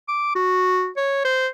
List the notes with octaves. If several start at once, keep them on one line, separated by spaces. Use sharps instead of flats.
D6
F#4
C#5
C5